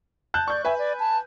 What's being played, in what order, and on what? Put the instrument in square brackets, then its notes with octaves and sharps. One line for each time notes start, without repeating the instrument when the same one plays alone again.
[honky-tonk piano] A5 F#6 G6
[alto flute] D5 [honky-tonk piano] C#6 G6
[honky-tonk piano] B4 G#5 [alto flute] E5
[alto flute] D5
A5